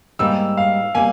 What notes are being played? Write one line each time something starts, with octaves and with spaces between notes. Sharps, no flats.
G#2 G3 A#3 E6
F5
G3 A#3 G#5